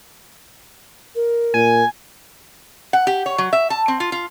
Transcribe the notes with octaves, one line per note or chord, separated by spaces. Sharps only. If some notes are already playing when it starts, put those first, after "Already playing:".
A#4
A#2 G#5
F#5
G4
C#5
F#3
E5
A5
C4
F4
F4